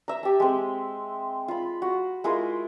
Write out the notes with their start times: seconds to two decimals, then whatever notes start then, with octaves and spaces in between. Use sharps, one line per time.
0.08 E5 A#5
0.23 G4 A5
0.40 G#3 C4
1.48 F4 B5
1.82 F#4
2.24 G#3 E4 F4 A#4